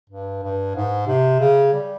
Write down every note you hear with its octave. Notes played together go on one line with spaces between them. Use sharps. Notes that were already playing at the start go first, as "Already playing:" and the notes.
G2
G2
G#2
C3
C#3
G3